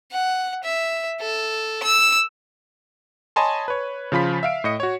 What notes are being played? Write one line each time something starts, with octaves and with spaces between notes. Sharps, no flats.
F#5
E5
A4
E6
C#5 D#5 G#5 A5 B5 C6
B4 C#5
C#3 F3 F4 B5 B6
E5 F5 D7
A2 D#5 C#7
F#4 C#5